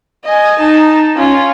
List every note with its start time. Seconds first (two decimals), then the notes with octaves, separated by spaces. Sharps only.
0.24 D#5 G#5
0.59 D#4 A5
1.16 C#4 F4